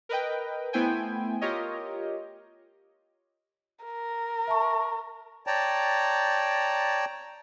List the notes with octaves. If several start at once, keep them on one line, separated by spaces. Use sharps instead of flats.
A#4 B4 D#5 G5
A3 B3 E4 C5 G5 G#5
F4 G4 A#4 C#5 D#5
A#4
E5 A5 C#6
C#5 D5 G5 A5 A#5